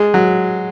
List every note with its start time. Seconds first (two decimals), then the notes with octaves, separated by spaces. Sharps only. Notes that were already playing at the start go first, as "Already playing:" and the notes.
Already playing: G#3
0.14 F#3